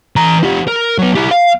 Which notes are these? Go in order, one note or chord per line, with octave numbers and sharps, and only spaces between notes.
E3 A#5
F3 G4
A#4
F#3 B3
E4 G4
F5